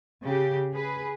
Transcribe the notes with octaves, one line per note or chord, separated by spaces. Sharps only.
C#3 G4
G#4 B4